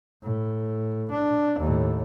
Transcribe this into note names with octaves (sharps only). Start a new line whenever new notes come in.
A2
D4
D#2 A2